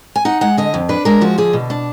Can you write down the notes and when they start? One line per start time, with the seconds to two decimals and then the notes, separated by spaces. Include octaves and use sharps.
0.16 G#5
0.25 D#4 F#5
0.41 G#3 F#5
0.57 D3 D#5
0.74 F2
0.89 D4 B4
1.05 G#3 A#4
1.21 F3 F#4
1.38 D3 G#4
1.53 B2
1.70 D4